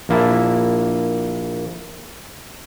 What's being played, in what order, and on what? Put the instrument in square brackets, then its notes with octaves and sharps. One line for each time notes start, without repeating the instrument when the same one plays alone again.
[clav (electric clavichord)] A#1 A#3 E4 A5